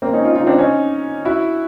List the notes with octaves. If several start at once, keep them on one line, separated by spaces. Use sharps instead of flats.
A#3 C4
C#4 D#4
D#4 F4
D#4 F4
C4 D4
C#4 D#4
E4 F#4